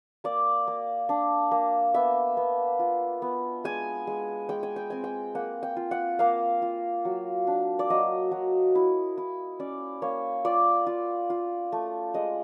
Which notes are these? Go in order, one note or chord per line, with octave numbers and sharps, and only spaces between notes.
A#3 D5
A#3
D4
A#3
B3 E5
B3
F4
B3
G#3 G#5
G#3
G#3 G5
G#5
G5
C4 G#5
G5
A#3 F#5
G5
F4
F#5
A#3 F5
F4
F#3
D4
D5
F#3 D#5
F#3
E4
E4
C#4 D5
A#3 C#5
F4 D5
F4
F4
A3
G#3 D#5